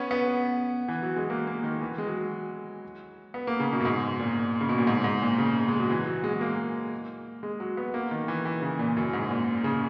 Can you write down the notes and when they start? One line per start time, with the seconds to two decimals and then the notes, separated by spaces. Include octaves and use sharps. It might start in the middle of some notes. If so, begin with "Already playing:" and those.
Already playing: B3 C#4
0.11 B3
0.88 E3
1.03 F#3
1.16 G#3
1.30 A#3
1.47 A#3
1.63 D#3
1.81 E3
1.98 G#3
2.07 F#3
3.34 B3
3.47 A#3
3.60 C#3
3.73 B2
3.80 F#2
3.85 G#2
4.19 A#2
4.61 C#3
4.69 B2
4.78 A#2
4.87 G#2
5.04 G#2
5.22 A#2
5.38 C#3
5.68 G#3
5.79 F#3
5.90 E3
6.07 F#3
6.24 G#3
6.41 A#3
7.43 G#3
7.60 F#3
7.77 B3
7.94 A#3
8.11 D#3
8.28 E3
8.45 E3
8.62 C#3
8.79 A#2
8.97 F#2
9.13 G#2
9.30 A#2
9.64 C#3